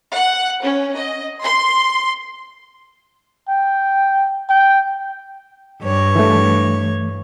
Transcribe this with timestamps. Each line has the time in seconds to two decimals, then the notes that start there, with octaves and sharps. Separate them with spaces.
0.15 F#5
0.62 C#4
0.98 D#5
1.41 C6
3.49 G5
4.49 G5
5.82 G2 C#5
6.16 E3 A3